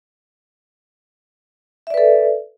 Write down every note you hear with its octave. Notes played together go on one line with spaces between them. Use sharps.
A4 B4 D5 E5